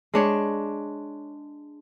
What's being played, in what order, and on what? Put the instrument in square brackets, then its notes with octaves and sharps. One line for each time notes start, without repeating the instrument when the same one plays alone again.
[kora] G#3 D4 C#5